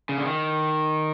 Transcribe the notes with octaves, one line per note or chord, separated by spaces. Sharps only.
C#3
D3
D#3